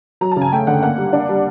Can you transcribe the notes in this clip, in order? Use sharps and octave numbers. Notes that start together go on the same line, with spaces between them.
F#3 A#5
A5
C#3
G#5
A3 G5
D3 F#5
A#3 F#5
G3
D4
G3